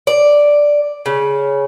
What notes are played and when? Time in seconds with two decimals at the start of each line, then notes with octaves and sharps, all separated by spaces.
0.07 D5
1.06 C#3